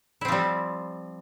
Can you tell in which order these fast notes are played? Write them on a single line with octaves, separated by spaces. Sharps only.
E4 C4 F3 G3